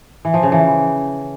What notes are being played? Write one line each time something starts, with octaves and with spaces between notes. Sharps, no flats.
E3
F3
C#3
E3